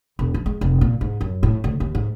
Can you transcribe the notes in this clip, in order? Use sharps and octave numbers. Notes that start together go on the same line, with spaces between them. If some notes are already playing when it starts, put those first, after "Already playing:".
E1
F3
G#3
F1
A#2
G#2
F#2
A2
D2
D#2
G#2